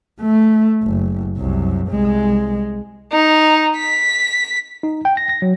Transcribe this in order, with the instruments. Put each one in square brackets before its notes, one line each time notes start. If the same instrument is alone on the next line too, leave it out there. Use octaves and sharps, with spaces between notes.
[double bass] A3
F#1
C2 F#2
C2 G#3
[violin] D#4
B6
[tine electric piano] D#4
G5
A#6
A#6
F#3